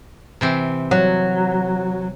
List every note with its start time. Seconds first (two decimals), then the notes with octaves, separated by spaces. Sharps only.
0.41 C3 E3 C4
0.91 F#3